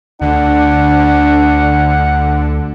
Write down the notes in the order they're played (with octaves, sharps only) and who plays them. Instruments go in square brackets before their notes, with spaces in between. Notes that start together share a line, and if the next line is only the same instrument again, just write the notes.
[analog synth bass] D2 [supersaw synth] D3 [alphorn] D4 [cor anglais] F#5